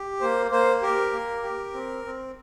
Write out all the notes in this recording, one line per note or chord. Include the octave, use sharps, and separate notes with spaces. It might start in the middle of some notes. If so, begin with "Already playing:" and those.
Already playing: G4
A#3 C5
A#3 C5
G4 A#4
A#3
G4
C4
C4